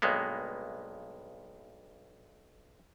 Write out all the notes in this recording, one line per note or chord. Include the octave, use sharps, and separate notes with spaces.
B1 G2 G#3 A#3 B3